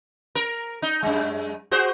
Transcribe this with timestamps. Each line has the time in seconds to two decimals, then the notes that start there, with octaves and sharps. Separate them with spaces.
0.35 A#4
0.82 D#4
1.03 F#2 G#3
1.71 F#4 G#4 C5